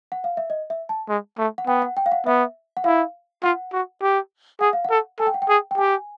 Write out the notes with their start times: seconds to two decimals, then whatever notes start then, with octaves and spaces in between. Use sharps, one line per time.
0.12 F#5
0.24 F5
0.37 E5
0.50 D#5
0.70 E5
0.89 A5
1.09 G#3
1.38 A3
1.58 F#5
1.67 B3 G5
1.82 F#5
1.97 G5
2.06 F5
2.12 F#5
2.26 B3 E5
2.77 F#5
2.84 E4 F5
3.43 F4 F#5
3.73 F#4
4.02 G4
4.61 G#4 F#5
4.73 F5
4.85 F#5
4.90 A4
5.19 A4 G#5
5.27 G5
5.34 F#5
5.42 G5
5.49 G#4
5.71 G5
5.78 G4 G#5